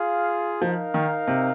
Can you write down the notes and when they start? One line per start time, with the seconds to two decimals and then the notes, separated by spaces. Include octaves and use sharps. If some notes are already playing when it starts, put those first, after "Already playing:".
Already playing: F4 G#4 F5
0.62 F3 D#4 A#4 F5
0.94 D#3
1.28 C3